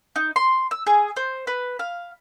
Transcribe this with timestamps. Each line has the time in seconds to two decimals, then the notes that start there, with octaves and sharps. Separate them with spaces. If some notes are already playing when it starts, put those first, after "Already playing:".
0.16 D#4
0.36 C6
0.71 E6
0.87 G#4
1.16 C5
1.47 B4
1.79 F5